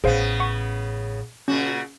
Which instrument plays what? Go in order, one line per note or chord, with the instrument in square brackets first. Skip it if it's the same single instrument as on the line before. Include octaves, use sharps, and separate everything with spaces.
[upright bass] A1 [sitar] C#3 B3 [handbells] G#4 C5 F5
[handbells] F#5 C#6
[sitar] A#2 C#3 F#4 [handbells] C#4